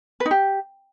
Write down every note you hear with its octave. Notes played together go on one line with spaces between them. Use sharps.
B4
D#4
G4